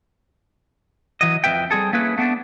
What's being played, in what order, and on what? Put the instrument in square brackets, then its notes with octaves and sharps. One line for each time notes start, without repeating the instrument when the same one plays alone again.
[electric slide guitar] E3 F#3 D#5
F2 G#3 B4 E5 G5
G3 C4 G#4 A4
A3 A#3 C#4 E4 G#4 B4
A3 B3 D4